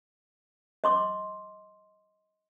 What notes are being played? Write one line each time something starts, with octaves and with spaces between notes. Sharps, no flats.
D#5 C6 D6